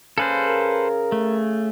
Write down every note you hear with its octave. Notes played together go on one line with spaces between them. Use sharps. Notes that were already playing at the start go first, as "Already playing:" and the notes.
C#3 A4 B4 C5
A#4
A3